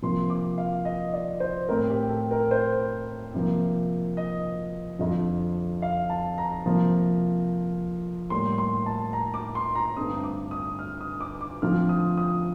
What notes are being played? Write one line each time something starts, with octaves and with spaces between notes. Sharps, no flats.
C3 F3 A#3 C6
D6
F5
D#5
D5
C5
A2 A3 C4 A#4
G4
A4
A#4
C5
C3 F3 A#3
D#5
F2 D3 F3
F5
A5
A#5
C3 F3 A#3
A2 G3 A#3 C6
C6
A5
A#5
D6
C6
A#5
G2 D3 A3 C4 D#6
D6
D#6
F6
D#6
D6
D6
D3 F3 A3 C4 F6
D#6
D#6